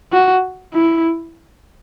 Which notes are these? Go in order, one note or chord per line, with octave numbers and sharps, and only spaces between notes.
F#4
E4